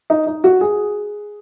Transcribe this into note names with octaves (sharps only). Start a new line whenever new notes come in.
D#4
D#4
F#4
G#4